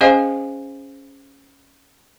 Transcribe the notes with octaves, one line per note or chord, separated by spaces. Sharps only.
C#4 G#4 C5 D#5 F5 G#5